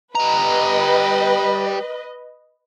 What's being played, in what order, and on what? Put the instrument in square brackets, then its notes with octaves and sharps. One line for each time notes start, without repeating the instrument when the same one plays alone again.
[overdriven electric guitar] G3 A#5 [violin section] B4 D#5